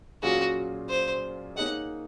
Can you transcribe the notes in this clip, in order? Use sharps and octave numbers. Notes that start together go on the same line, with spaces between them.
A#2 F#3 C#4 F4 F#4 G#4
C5
A#3 D#4 G#4 C#5 F#5